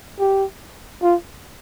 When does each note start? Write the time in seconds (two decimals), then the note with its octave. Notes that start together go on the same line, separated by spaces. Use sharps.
0.19 G4
1.03 F4